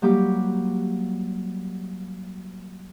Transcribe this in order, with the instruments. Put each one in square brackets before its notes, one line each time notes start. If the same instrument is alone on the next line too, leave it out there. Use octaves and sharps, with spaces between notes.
[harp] F#3 G3 A#3 G4 D6